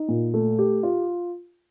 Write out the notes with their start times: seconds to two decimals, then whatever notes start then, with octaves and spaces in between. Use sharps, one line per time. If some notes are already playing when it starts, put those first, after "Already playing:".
Already playing: D#4
0.08 A#2
0.34 A3
0.59 G4
0.83 F4